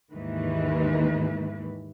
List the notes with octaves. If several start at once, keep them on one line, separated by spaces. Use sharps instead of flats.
D#2 G#2 D#3 E3 G#3 B4